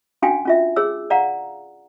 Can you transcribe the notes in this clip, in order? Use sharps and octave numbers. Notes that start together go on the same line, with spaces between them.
C#4 D4 F#4 F5 G5 G#5
C#4 F4 E5
G#4 C#5 E6
D5 F5 F#5 A#5